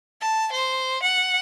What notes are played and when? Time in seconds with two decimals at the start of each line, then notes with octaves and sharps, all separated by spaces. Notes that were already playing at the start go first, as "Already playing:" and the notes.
0.21 A5
0.53 C5
1.03 F#5